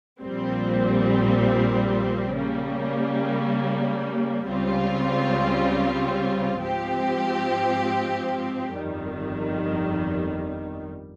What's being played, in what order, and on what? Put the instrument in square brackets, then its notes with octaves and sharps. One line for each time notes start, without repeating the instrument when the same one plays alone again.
[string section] A#1 A#2 G3 C4
C#3 G3 A#3
C#2 C#3 G3 C4 F4
G#2 F3 C4 G4
G1 F2 D#3 G3